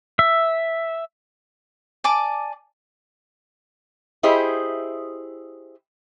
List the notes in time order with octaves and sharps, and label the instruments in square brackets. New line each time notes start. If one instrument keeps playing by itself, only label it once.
[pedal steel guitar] E5
[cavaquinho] D5 G#5 A5 D6
[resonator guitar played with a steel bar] E4 G4 G#4 C5 D#5 E5